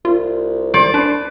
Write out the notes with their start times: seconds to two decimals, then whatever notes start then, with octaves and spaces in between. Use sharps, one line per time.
0.05 C2 F4
0.74 C5 D5
0.94 D4 B4